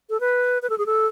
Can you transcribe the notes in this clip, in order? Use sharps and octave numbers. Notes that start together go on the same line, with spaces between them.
A4
B4
B4
A4
G#4
A4